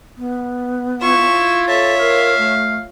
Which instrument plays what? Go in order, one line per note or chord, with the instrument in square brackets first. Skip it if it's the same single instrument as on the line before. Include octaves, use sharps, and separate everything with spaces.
[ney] B3
[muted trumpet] E4 [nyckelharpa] F4 [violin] C#6 E7
[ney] A4 [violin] C#5 E5 [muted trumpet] A5
[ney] A#4 [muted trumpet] F5
[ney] A3